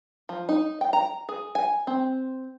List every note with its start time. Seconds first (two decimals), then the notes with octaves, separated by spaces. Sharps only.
0.29 F3
0.49 D#4
0.81 G5
0.93 A#5
1.29 G#4
1.55 G#5
1.87 C4